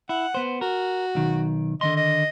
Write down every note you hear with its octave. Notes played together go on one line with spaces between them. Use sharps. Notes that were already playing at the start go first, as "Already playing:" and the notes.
E4 F#5
B3 C5
F#4 A#4
B1 D#3
D3 D#3 D#5 C6
D#5